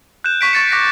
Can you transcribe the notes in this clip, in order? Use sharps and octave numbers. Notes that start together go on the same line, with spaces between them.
F#6 G6 E7
C#6 B6 D7
C#6 A6 C#7
D6 F#6 A#6 B6